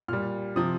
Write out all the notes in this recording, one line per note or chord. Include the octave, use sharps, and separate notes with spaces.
A#2 G3 F6
C3 F3 D#6